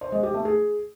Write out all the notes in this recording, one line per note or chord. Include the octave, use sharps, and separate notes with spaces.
C5
G#3
G4
A3
G#4